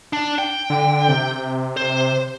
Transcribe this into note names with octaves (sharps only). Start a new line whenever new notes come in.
D4
G5
D3
C3
C5